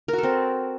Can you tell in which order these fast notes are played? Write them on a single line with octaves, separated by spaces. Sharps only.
A#4 F#4 A4 C4